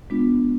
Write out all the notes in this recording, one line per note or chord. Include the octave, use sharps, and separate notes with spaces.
G#3 B3 D4 F4